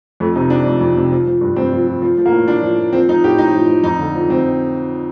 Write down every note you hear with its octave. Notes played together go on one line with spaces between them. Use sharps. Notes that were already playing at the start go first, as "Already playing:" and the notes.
F2 A3
C3 D#4
F3 D4
F2
F2
C3
F3
F3
G2
G2 C4
F3
F3
F3
F3
A#3
A2
A2 D4
F3
F3
F3 C4
F3 D#4
A2 G4
A2 D#4
F3
F3
F2 D#4
D3
F3
F2 C4